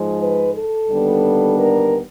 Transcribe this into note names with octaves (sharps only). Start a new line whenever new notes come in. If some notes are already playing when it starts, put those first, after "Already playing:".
Already playing: G#2 F3 G#3
B4
A4
D#2 D3 G3 B3 D4
A#4